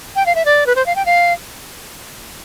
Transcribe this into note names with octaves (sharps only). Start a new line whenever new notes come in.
G5
F5
E5
D5
B4
C5
F5
G5
F5